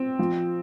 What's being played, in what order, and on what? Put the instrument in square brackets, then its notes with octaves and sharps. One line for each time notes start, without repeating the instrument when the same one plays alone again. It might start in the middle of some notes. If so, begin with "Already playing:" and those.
Already playing: [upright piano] C4
F3